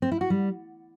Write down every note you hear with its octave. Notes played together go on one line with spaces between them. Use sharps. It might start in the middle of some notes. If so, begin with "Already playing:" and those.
C4
E4
F#4
G3